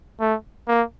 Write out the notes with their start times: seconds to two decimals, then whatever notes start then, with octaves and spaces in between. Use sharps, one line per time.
0.20 A3
0.68 A#3